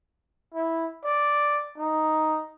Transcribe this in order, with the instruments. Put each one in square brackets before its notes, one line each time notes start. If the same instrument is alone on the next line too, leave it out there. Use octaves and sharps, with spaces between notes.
[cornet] E4
D5
D#4